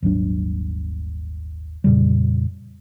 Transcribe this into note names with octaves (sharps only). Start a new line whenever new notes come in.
D#1 G#1 F#3 D4
F2 A#2 C#3 G3